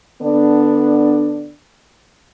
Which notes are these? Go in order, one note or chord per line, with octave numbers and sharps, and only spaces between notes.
D3 B3 D4